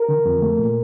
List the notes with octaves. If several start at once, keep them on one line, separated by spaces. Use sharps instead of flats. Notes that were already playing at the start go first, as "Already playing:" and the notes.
Already playing: A#4
D3
F2
A3
A#2